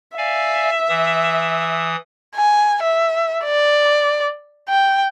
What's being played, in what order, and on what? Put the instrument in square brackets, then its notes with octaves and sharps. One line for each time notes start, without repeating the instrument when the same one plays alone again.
[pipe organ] D5 F5 G#5 [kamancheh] E5
[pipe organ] E3 D#6
[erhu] G#5
E5
D5
G5